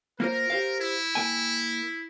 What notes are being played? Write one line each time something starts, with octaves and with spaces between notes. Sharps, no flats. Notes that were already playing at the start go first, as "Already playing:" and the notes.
A#3 F4 A#4 C5
G4 C5 F5
E4
A#3 G5 G#5